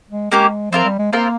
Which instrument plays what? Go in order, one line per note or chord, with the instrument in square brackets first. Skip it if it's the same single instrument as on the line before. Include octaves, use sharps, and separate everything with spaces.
[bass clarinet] G#3
[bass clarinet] G#3 [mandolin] A#3 C#4 G4 A#4
[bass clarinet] F3 [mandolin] C4 F4 A#4
[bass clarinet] G3
G#3
[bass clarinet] A#3 [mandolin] C4 F4 A#4